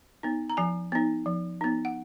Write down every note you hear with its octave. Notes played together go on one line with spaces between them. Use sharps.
B3 D#4
A#5
F3 G#5
B3 D#4
F3
B3 D#4
F#5